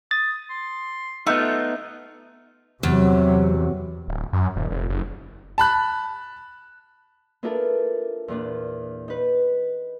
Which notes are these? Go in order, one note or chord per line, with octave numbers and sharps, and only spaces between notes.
D#6 A6
C6
A3 B3 D#4 F4
E2 C3 F#3
D1
F#2
D#1
F1
F#1
A5 B5 F#6
B3 D4 E4 F4 A4 A#4
E2 A#2 D4
D#4 B4